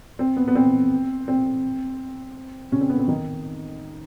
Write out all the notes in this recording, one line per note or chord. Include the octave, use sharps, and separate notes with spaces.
C4
B3
B3
C4
C4
C#3 C#4
C4
B3
C4
D#3 D#4